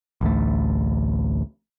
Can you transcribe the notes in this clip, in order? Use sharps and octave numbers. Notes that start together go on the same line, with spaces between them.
A1 D2 A3